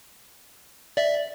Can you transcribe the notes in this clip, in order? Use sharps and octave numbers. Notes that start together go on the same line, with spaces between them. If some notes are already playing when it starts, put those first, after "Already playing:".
D5 E5